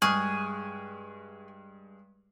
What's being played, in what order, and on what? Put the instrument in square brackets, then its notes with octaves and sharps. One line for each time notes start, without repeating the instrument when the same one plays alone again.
[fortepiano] G2 G#3 [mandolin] G#4 [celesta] C#6 F6 F#6